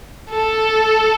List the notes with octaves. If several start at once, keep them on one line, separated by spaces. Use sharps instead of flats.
A4